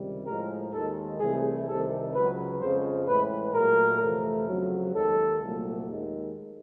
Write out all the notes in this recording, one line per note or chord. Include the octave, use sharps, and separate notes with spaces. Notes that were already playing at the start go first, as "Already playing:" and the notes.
Already playing: C#2 C3 D#3 G3
A2 F3 G#3 A#4
D#2 D#3 G#3 A4
C2 C3 E3 A3 G#4
C2 C3 D#3 A4
C#2 C#3 F#3 B4
F2 C#3 F3 G#3 C5
A2 E3 G#3 B4
A#2 F#3 A3 A#4
F2 C3 E3 A3
F2 C#3 F#3
D#2 D#3 G#3 A4
C2 A#2 F#3 A3
D#2 D#3 G#3